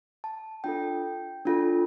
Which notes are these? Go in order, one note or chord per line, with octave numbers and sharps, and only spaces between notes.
A5
D4 F4 A4 G5
D4 F4 A4